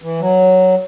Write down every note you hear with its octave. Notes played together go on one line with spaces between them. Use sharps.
E3
F#3